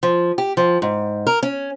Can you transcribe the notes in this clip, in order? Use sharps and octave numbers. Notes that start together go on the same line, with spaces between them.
F3
G4
F3
G#2
A#4
C#4